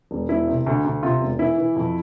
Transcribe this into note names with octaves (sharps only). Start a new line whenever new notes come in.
E1
E1 E4
C3
D2
D2
C3 F4
E1
E3 E4
E3
F2